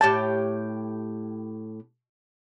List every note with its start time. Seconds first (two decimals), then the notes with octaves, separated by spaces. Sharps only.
0.01 A2 G4 G5 A5